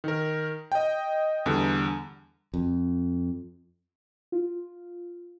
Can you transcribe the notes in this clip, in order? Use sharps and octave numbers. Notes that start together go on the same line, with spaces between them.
D#3 A#4
D#5 G5
E2 D3 G3
F2
F4